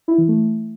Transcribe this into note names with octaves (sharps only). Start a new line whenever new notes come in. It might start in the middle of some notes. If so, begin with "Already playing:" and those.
E4
E3
A3